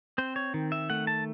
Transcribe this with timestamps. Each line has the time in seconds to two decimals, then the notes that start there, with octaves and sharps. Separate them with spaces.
0.18 C4 C5
0.36 C#5
0.54 D#3
0.72 E5
0.90 A3 F#5
1.07 A5